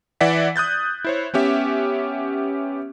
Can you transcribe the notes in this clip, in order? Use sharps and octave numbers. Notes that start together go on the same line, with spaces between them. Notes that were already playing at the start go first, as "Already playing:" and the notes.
E3 D5 E5 F#5 B6
D#6 F#6 G6 A6
E4 C5 C#5
B3 C#4 G4 E5